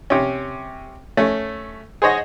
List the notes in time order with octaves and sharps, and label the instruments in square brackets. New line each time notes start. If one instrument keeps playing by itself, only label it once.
[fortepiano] C3 C#4
A3 C#4
G#4 C5 C#5 D#5 F#5